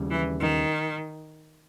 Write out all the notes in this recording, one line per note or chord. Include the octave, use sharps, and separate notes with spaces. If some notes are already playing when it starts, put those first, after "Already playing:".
Already playing: D#2 C#3 G3
E3
D#3